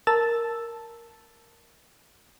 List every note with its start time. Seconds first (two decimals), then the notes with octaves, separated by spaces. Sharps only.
0.07 A#4 A5 E6 A6